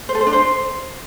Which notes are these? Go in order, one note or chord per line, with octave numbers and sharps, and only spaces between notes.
C5
A4
C5
D4
C5